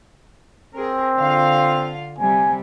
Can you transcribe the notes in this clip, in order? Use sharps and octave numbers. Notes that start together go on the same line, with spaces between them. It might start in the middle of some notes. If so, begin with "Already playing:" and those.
C4 G#4 A#4
D3 F4 F5
C3 G3 G#5